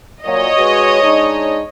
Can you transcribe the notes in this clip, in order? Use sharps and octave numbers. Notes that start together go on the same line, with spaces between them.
A#2 F#3 C#5 D#5
G#3 F#4 B4
G#3 D4 D#4